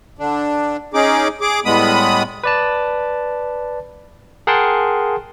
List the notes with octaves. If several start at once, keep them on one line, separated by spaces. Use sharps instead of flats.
D3 D4
C#4 D#4 G#4 D6
G#4 D6
A2 G3 G#3 B3 B5 D#6
B4 D5 A5
G#4 A#4 F#5 G5 A5 C6